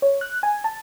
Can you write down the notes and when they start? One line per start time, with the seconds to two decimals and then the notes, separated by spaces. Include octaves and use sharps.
0.02 C#5
0.21 F#6
0.43 G#5
0.64 A5